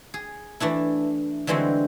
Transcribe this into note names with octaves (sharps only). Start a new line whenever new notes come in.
G#4
E3 A3 D4 E4
D3 E3 G3 G#3 C4 F#4